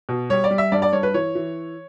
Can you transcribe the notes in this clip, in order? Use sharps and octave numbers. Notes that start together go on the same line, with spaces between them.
B2
G3 C#5
D5
G3
E5
G2 D5
D5
G2 C#5
B4
E3 C#5
E3